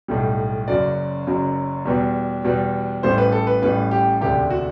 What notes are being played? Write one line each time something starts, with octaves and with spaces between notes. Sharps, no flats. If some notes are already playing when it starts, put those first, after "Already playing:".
B1 A2 G3
F#1 F#2 F#3 D5
F#1 F#2 F#3
E2 B2 G3
E2 B2 G3
A1 A2 G3 C5
B4
A4
B4
A1 A2 G3 B4
G4
E1 D2 C3 G4
F#4